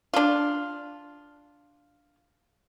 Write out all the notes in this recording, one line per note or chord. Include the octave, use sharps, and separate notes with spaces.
D4 F4